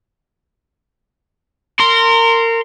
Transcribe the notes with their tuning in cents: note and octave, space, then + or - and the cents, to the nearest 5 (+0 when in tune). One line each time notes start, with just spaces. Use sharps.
A#4 -25 C6 +0